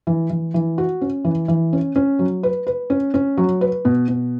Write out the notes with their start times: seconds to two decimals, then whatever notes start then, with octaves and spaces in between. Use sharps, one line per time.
0.07 E3
0.30 E3
0.54 E3
0.78 F#4
1.01 C#4
1.24 E3
1.48 E3
1.73 C#4
1.96 C#4
2.19 F#3
2.43 B4
2.67 B4
2.90 C#4
3.14 C#4
3.37 F#3
3.61 B4
3.85 B2
4.08 B2